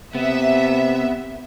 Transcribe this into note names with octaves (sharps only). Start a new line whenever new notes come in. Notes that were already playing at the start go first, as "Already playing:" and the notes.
C3 B3 E5